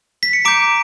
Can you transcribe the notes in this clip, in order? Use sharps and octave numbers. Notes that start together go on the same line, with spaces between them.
B6
C#7
A#5 D6 G6 D7